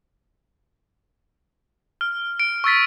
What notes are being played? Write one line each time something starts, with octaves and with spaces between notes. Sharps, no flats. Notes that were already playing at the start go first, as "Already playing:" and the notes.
F6
D7
C#6 E6 A6 B6